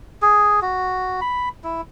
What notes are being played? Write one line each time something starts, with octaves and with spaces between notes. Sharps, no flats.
G#4
F#4
B5
E4